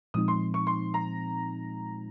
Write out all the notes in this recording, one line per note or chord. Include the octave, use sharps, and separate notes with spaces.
A#2 F3 G#3 C4 D#4 D#6
C6
C#6
C6
A#5